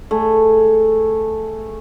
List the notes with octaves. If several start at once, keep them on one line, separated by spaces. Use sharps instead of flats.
A3 G#4